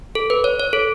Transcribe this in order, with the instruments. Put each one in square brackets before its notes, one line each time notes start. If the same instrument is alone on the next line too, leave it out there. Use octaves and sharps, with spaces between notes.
[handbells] A4
B4
C#5
C#5
A4